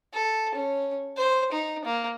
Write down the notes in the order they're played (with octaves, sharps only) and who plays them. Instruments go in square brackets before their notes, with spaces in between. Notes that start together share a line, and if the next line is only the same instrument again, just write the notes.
[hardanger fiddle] A4
C#4
C5
D#4
A#3